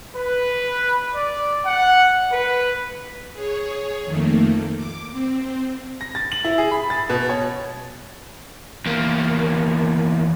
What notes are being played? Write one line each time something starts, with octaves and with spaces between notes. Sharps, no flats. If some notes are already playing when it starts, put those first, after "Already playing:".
B4
D5
F#5
B4
G#4 C#5
F2 D#3 A3 A#3
D6
C4
A#6
A6
F#7
E4
G#4
B5
A6
B2
C#5
E2 A#3